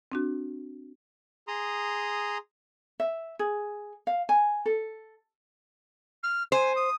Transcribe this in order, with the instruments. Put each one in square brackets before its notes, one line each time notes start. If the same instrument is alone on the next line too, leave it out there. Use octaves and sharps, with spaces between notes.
[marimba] C4 D4 F#4
[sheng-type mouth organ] G#4 A#5 C6 D#6
[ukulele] E5
G#4
F5
G#5
A4
[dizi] F6
[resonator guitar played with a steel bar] C5 [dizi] G#5
[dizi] D#6